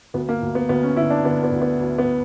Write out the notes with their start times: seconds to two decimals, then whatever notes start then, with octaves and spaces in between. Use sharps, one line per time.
0.14 D2 B3
0.29 A#3
0.42 D2
0.55 B3
0.69 D2 B3
0.83 C#4
0.96 D3 E4
1.10 D4
1.24 D3 B3
1.43 B3
1.52 D2
1.62 B3
1.79 D2
1.99 B3